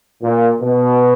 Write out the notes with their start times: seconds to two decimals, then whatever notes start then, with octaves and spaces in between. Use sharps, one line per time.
0.23 A#2
0.61 B2